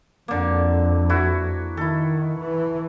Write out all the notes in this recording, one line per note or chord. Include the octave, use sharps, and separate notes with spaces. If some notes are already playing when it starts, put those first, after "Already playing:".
F2 D3 A#3
E4 F#4
D#3 E4 A4
E3